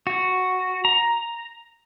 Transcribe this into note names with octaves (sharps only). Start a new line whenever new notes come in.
F#4
A#5